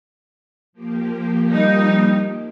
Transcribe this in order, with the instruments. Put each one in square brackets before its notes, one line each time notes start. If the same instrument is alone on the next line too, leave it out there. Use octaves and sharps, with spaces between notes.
[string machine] F3 A#3 G4
[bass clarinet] G3 [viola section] D#4